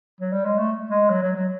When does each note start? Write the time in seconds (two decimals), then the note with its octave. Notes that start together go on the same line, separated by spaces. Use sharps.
0.21 F#3
0.32 G3
0.45 G#3
0.58 A3
0.91 G#3
1.10 F#3
1.23 F#3
1.35 F#3